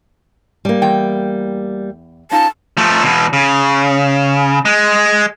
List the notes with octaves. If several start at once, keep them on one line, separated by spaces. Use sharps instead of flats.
G3 A#3
E2 G5
C#4 D#4 F4 A5
F3 A3
E2 B2
C#3
G#3